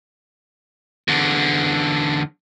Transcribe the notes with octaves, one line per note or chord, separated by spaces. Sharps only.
E2 D3